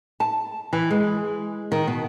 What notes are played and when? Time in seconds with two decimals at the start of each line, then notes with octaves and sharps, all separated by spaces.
0.20 A5
0.73 E3
0.90 G#3
1.72 D#3
1.87 B2